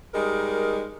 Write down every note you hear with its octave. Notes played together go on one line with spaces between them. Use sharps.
G3 G#3 D#4 A#4